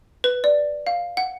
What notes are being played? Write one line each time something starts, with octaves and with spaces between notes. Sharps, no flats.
B4
D5
F5
F#5